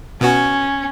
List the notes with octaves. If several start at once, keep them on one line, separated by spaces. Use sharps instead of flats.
B2 B3 C#4 F#4